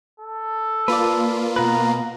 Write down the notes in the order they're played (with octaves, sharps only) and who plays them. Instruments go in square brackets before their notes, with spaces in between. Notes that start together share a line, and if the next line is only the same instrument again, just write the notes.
[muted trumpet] A4
[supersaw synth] A#3 F4 [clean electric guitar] B4 D5
[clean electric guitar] B2 B4 [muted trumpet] A#5